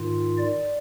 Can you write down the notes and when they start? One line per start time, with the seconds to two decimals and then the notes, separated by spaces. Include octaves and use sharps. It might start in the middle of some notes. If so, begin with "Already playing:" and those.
Already playing: G#2 D#3 F4
0.38 D5